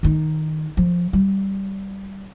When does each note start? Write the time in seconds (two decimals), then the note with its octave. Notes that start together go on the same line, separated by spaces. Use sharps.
0.03 D#3 D#4
0.77 F3
1.13 G3